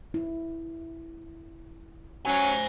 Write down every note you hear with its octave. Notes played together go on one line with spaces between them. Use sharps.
E4
F#3 C#4 C5 G#5